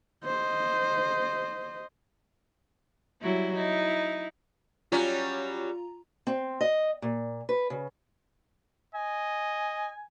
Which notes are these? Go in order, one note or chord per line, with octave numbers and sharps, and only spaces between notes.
C5 D#5
F#3 G3 E4
D#4 E4
F#3 G3 C#4 F4 A#5
C4
D#5
A#2
B4
C#3
D#5 G#5